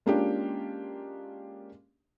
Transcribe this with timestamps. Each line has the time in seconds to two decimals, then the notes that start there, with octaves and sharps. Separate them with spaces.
0.06 G#3 A#3 C#4 D4 F4 G4